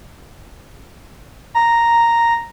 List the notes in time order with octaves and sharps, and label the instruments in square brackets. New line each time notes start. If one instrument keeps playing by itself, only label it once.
[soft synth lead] A#5